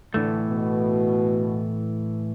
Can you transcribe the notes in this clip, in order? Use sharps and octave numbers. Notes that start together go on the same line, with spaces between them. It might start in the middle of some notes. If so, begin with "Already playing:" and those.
A2 D3 E3 A3
B2